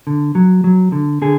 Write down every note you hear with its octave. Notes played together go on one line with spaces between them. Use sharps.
D3
F#3
F#3
D3
D3 G#4